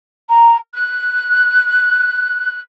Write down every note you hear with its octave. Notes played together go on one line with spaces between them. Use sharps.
A#5
F#6